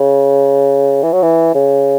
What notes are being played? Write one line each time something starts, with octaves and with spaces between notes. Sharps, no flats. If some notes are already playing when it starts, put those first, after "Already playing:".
Already playing: C#3
E3
F#3
E3
C#3